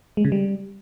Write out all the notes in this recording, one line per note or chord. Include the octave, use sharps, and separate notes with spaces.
G#3
C#3
G3